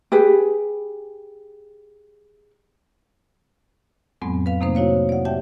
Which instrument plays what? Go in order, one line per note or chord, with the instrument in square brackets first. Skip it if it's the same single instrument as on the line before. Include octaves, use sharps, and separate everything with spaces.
[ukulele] G4 G#4 B4
[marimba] F2 A2 F#3 G#3 B3 C4
B4 F5
C3 A3 A#3 C4 D#4 C5
E4 F#4 C#5 F5
D5 F#5
G4 E5 G5 A5